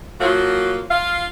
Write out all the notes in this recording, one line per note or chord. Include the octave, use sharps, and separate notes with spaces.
F3 F#3 A#3 F4 F#4
F4 F5